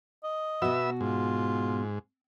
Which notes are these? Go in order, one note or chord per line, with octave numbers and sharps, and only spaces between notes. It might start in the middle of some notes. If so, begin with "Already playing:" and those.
D#5
B2 B3 F#4 E5 E6
G#2 F4